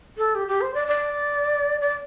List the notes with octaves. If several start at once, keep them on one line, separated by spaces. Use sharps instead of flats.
A4
G4
G4
C5
D5
D5
D5